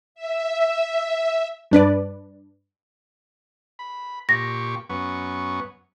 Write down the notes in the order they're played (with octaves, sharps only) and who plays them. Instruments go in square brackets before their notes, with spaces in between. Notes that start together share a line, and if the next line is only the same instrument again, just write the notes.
[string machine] E5
[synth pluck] G2 D4 B4 D5
[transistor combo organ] B5
[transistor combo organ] A#2 G4 C#6 [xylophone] A#6
[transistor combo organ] F#2 B3 C#6